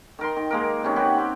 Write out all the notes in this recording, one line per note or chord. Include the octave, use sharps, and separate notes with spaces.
D#3 A#4 C6
D#3
G#3 A#3 A#4
C3 D#3 C#4
C#4 F#4 G4 B4
C4 G4